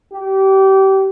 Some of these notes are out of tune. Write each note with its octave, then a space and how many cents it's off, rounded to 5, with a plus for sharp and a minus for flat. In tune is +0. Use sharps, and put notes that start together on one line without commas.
G4 -25